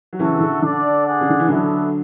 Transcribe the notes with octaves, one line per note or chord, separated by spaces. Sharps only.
F#3
C#3 E3 F#4 A4 E5
C#3
D3
D3 D4 A4 D5 F#5
D4 G#4 D5 F#5
C#3
D3
E3
D3 F#3 B3 D4 F#4 A4 E5